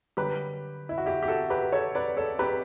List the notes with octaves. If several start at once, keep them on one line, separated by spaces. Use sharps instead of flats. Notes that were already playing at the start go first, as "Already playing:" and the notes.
F#2 D3 G3 G4 B4
E4
F#4
E4 G4
G4
F#4 A4
G4 B4
A4 C#5
B4 D5
A4 C#5
G4 B4